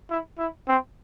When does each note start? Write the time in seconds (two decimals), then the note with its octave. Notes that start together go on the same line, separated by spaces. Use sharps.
0.10 E4
0.38 E4
0.68 C4